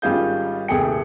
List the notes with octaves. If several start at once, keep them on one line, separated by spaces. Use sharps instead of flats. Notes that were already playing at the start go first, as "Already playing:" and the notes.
G#1 G3 C#4 F4 G#4 G6
D#1 C3 A3 G#4 G5 C#7